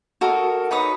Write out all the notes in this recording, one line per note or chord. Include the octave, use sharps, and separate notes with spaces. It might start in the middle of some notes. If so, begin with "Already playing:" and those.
F#4 A4 A#4 D#5
D#4 B4 C#5 D#6